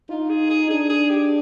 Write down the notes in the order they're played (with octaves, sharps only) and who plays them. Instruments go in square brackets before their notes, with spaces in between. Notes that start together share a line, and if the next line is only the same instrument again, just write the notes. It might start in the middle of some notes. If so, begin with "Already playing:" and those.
[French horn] D#4 [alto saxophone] F4
[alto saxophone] G#4
G#4
[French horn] D4 [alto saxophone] G#4
[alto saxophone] G#4
G4